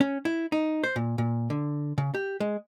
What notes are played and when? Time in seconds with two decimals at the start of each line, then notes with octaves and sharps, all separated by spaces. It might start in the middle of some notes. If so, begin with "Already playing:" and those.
0.01 C#4
0.25 E4
0.52 D#4
0.84 C5
0.96 A#2
1.18 A#2
1.50 D3
1.98 C#3
2.14 G4
2.40 G#3